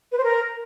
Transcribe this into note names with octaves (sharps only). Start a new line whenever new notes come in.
B4
C5
A#4